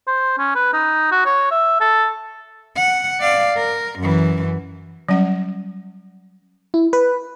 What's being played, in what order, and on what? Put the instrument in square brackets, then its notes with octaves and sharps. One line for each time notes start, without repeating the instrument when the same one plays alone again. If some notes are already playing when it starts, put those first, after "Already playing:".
[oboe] C5
C#4
B4
D#4
F#4
C#5
E5
A4
[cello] F#5
D5 F5
A#4
F#2 E3
[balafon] F#3 G3 C#4 F#5
[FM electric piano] E4
B4